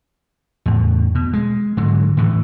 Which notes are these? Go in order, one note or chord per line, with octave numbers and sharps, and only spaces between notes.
E2 A2
B2
G#3
G#2 D3 F#3
A2 E3